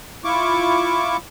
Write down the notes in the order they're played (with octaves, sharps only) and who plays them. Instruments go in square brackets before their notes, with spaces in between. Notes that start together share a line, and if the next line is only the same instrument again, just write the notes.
[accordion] E4 F4 C#6 D6